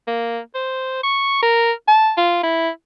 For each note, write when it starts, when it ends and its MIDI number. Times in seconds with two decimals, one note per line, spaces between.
0.08 0.39 58
0.55 1.03 72
1.03 1.39 85
1.43 1.72 70
1.88 2.12 81
2.17 2.39 65
2.43 2.69 64